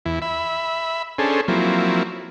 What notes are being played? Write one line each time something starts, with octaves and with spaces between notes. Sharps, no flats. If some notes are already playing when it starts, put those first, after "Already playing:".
E2 E4
E5 B5
C#4 D4 G#4 A4 C5
F3 F#3 A#3 C4 E4